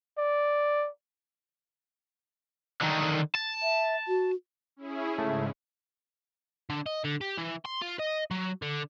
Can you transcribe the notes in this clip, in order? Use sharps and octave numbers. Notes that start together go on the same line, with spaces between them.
D5
D3 D#3
A5
E5
F#4
C#4 E4 G#4
G#2 C#3 A3
D3
D#5
D3
G4
E3
C6
F4
D#5
F#3
D3